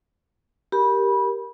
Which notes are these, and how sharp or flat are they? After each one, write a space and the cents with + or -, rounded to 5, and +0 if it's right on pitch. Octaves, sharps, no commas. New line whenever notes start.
G4 -5 A#4 +0 B5 -20